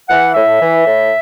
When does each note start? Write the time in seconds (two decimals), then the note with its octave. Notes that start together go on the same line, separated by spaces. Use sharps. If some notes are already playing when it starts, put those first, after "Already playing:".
0.09 E3 F#5
0.34 A2 E5
0.60 E3
0.85 A2